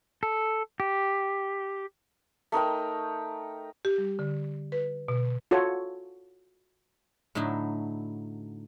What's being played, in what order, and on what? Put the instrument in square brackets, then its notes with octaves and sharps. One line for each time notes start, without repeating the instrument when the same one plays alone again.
[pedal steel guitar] A4
G4
[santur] A3 D#4 A#4 G5
[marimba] G4
G3
D3
B4
B2
[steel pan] F4 F#4 A4 C#5
[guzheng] A2 D3 F#3 D#4 E4